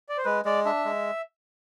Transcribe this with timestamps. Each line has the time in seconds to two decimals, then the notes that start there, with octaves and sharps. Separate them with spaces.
0.09 D5
0.18 C5
0.25 G#3 B4
0.45 G#3 D5
0.65 D4 E5
0.85 G#3